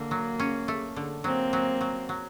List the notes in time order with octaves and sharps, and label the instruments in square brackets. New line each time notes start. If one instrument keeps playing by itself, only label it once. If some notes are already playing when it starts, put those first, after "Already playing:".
Already playing: [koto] D3 [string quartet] A#3
[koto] F#3
C#4
A3
D3
[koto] F#3 [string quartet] A#3 C4
[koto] F#3
F#3
F#3